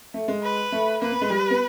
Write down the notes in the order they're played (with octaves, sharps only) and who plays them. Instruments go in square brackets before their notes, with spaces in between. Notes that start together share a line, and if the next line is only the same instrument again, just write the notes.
[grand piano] A3
G#3
[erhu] B4
[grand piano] A3
[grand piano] A#3 [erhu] B4
[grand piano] B3
G#3
G3
B3